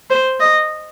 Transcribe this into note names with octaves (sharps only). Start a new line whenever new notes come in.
C5
D#5